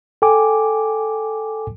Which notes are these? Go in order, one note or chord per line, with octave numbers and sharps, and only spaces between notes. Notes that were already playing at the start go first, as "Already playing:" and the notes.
A4 G5 G#5 D6